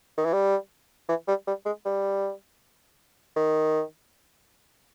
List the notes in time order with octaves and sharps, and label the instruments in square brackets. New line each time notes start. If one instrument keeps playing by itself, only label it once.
[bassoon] D#3
E3
G3
E3
G3
G3
G#3
G3
D#3